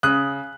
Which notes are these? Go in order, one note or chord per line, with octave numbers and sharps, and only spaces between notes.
C#3 D#6 F#6